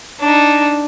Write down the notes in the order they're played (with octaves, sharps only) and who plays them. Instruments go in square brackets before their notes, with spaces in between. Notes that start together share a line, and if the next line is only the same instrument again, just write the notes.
[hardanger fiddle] D4 D#4